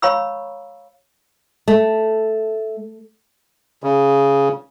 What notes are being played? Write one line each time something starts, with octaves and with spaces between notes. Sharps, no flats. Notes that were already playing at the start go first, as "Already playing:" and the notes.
C#5 F5 A#5 B5 C#6 E6
A3
C#3